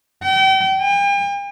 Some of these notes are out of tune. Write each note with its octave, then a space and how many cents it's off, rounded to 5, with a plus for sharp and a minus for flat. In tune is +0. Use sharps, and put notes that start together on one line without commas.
G5 -35
G5 +45